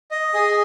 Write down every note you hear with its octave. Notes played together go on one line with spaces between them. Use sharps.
D#5
G#4